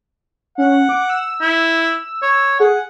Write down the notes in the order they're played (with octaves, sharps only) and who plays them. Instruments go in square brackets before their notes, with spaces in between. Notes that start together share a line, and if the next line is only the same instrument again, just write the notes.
[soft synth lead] C#4 [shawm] F#5
[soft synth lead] D6
E6
[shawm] E4
C#5
[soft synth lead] G#4 [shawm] F#5